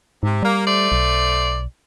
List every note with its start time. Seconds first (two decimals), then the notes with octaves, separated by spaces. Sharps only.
0.23 G#2 C3
0.42 G3 A#3
0.66 A3 C5 D5
0.92 B1